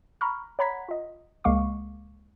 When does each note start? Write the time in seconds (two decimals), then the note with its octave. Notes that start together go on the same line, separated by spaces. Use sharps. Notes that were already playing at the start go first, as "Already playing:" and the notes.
0.21 A#5 B5 C#6 F6
0.59 C#5 F#5 A#5 B5 G#6 B6
0.89 F4 D#5
1.44 C#2 G#3 A#3 F5 C#6 D6